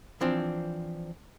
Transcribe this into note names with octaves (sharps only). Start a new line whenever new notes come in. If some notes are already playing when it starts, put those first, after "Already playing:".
E3 F3 C4 D4